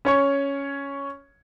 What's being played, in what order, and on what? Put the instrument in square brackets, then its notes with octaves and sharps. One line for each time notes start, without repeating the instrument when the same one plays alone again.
[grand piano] C#4 C#5 C#6